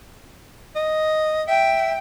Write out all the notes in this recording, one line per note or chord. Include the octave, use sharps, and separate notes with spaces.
D#5
E5 G5